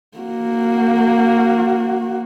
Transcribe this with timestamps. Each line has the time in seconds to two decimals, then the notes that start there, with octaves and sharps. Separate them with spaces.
0.18 A#3 F#4